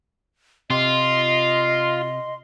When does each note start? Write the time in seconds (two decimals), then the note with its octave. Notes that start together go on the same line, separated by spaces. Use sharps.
0.70 C3 F4 D#5 C6